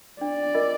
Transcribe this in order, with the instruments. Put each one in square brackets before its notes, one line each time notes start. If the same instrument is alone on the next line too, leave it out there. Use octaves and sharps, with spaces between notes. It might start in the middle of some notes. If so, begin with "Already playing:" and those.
[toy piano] D4 [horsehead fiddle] D5
[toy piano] F4 A#4 D#5